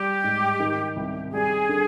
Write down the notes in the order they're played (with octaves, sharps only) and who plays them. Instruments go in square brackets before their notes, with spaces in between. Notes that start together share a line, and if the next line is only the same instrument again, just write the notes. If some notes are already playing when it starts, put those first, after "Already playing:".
Already playing: [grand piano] G3 [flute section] G4
[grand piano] G#2
D#3
C2
[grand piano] G3 [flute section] G#4
[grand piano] D3